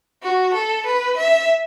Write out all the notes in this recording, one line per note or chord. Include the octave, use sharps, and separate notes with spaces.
F#4
A4
B4
E5